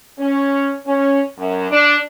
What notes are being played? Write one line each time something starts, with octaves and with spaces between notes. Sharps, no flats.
C#4
C#4
F#2
D4